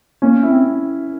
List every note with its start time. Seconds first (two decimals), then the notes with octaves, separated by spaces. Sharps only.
0.22 A#3 C#4
0.43 E4
0.49 C4